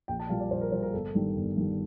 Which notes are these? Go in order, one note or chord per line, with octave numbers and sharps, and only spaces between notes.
A#1 G5
A5
A#2 G3 F5
D5
A#1 C5
A#4
A#2 G3 C5
A#4
G1 A4
G2 D#3 G3
G1
G2 D#3 G3